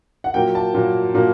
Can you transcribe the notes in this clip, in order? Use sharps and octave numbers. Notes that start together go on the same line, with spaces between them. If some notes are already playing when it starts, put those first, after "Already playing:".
F#5
A#2 F#3 A#3 G5
A5
A#2 F#3 A#3
A#2 F#3 A#3